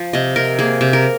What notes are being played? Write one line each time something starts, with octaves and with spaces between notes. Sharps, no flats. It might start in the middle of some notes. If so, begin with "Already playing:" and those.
Already playing: F3
C3 D#5
C3 A#4
A#3 G#4
C3
A#4